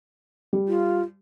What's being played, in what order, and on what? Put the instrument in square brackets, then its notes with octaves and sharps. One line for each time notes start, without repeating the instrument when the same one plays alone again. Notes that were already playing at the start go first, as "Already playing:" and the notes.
[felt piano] G3
[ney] F4